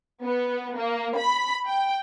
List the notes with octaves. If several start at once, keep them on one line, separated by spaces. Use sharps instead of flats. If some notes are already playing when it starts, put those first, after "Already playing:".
B3
A#3
B5
G5